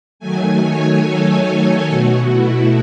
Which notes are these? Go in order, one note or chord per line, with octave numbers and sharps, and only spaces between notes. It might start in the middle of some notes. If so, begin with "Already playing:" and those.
D#3 F#3 A3 G#5
C#5
A4
B2 A3 F#4
E4